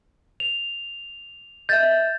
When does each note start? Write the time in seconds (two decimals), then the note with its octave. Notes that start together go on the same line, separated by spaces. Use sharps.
0.40 F7
1.69 D#5 E5 G6 A6